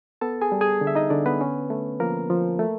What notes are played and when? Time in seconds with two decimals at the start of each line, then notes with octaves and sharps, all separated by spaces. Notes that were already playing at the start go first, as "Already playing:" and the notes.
0.21 B3 A4 A5
0.42 G#4 G#5
0.52 G3
0.61 G#4 G#5
0.81 D3
0.87 E5
0.95 D#4 D#5
1.10 D3 D4 D5
1.26 B3 B4
1.41 C#4
1.70 A3
2.00 F3 A#3 A#4
2.30 F3
2.59 A3